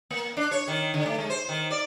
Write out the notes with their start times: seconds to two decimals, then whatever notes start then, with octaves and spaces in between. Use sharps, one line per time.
0.11 A#3
0.37 D4
0.51 C#5
0.68 D#3
0.94 D3
1.06 A3
1.18 G#3
1.30 C5
1.49 D#3
1.71 D5